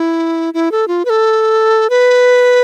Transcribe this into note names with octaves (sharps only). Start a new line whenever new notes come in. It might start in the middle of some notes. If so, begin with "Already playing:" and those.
Already playing: E4
E4
A4
F4
B4
A4
B4